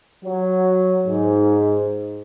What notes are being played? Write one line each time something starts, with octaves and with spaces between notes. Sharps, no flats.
F#3
G#2